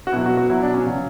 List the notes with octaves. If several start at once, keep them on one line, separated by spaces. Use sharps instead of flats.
F#4
B2 F#3 E4
F#4
F#4
B2 F#3 E4
D4
C#4
C#3 F#3